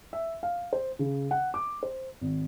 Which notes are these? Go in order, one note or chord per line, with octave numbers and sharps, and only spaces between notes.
E5
F5
C5
C#3
F#5
D6
C5
G#1